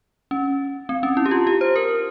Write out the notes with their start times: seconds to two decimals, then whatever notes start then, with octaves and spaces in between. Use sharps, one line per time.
0.31 C#4
0.89 C4
1.03 C#4
1.17 E4
1.26 G4
1.31 F4
1.47 G4
1.61 C5
1.76 A#4